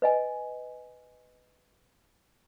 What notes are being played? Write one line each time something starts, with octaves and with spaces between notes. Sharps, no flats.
B4 D#5 G#5